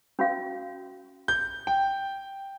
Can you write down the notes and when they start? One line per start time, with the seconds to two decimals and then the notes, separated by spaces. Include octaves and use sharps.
0.19 C#4 F#4 F5
1.28 G6
1.67 G5